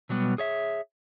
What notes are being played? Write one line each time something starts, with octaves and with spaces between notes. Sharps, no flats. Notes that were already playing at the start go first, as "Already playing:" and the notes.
B2 F#3 G3 B3
G#4 C#5 E5